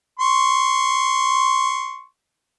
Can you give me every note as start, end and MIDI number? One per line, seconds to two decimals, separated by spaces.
0.20 2.04 84
0.20 2.04 85